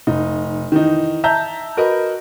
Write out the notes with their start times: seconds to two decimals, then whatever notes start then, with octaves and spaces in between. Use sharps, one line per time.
0.07 F1 D#4
0.72 D#3 E3 D#4
1.24 E5 A5 A#5 G6
1.77 F#4 A#4 B4 D#5